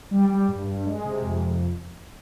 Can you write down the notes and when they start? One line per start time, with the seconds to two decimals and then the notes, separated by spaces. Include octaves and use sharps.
0.11 G3
0.29 G3
0.48 G2
0.67 G2
0.86 G#3
1.04 C3
1.22 F2